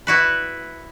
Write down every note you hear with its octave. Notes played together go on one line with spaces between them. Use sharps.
E4 F#4 B4